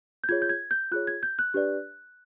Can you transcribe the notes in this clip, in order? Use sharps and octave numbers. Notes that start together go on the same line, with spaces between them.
G6
F4 G#4 C#5 G#6
G6
G#6
G6
F4 G#4 C#5 F#6
G#6
G6
F#6
D4 G4 B4 D5